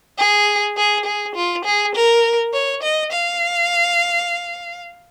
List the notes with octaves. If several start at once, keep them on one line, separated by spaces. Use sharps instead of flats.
G#4
G#4
G#4
F4
G#4
A#4
C#5
D#5
F5